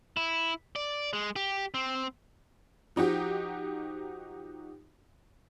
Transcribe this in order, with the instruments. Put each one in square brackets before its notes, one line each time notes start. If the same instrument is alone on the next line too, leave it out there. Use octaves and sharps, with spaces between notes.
[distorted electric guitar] E4
D5
G#3
G4
C4
[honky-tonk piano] F3 D#4 F#4 G4